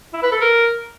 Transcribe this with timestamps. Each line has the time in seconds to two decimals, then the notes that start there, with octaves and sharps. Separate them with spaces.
0.13 E4
0.23 B4
0.32 A4
0.41 A#4